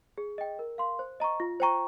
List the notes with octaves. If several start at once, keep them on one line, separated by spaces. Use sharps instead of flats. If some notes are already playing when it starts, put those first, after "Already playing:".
G#4
D#5 G5
A#4
F5 C6
C5
D#5 A#5 C#6
F4
C5 G5 A#5 C#6